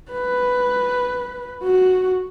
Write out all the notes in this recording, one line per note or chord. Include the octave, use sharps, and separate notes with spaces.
B4
F#4